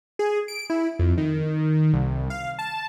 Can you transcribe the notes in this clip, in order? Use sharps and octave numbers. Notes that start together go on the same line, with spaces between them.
G#4
D7
E4
F2
D#3
C2
F5
A5